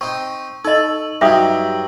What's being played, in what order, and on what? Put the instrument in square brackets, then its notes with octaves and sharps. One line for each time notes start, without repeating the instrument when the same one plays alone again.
[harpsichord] C4 D#4 [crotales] C#6
[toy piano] D#4 D#5 [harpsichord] A4 [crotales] E6 F#7
[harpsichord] G2 F#3 [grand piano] D#4 G4 [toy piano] E5 D#6